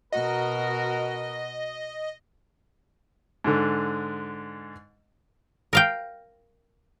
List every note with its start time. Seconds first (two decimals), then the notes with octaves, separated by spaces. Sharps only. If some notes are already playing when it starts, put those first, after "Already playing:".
0.12 B2 F#4 A#4 D#5
3.44 G#2 D3
5.73 A#4 F5 G5